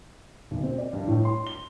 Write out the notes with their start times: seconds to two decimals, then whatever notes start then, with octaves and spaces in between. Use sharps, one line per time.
0.51 B1
0.63 C4
0.78 D5
0.93 G2
1.07 A2
1.25 C6
1.47 G7